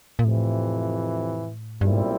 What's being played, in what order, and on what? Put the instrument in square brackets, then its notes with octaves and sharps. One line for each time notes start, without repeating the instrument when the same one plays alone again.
[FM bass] A#2
[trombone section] F2 C3 E3 [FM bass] A2
[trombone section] B1 A#2 G3 C4 E4 [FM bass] G2
[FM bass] G#2